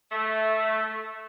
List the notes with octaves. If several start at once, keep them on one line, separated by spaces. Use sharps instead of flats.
A3